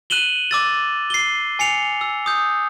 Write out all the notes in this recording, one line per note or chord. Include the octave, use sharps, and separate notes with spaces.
F#6 D#7 E7 F#7 G7
D6 E6 A6
C7 G7
G#5 C7 C#7 F7
E6
D#6 G6